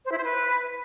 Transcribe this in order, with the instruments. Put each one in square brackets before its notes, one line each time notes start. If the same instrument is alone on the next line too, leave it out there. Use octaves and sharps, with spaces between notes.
[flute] C5
E4
C5
B4